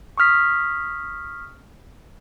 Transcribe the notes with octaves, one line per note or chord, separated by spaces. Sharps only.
C#6 D#6 F6 B6